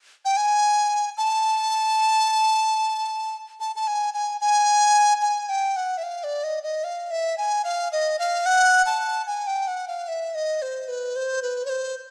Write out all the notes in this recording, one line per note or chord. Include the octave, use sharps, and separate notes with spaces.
G5
G#5
A5
A5
A5
G#5
G#5
G#5
G#5
G5
F#5
E5
F5
D5
D#5
D#5
F5
E5
G#5
F5
D#5
F5
F#5
A5
G#5
G5
F#5
F5
E5
D#5
C5
B4
C5
B4
C#5
C5